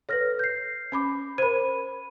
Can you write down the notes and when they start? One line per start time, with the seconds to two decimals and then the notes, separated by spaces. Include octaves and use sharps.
0.09 A4 B4 C#5 F6 A#6
0.39 G6 C7
0.92 C#4 B5 D6
1.38 A#4 C5 B5 D#7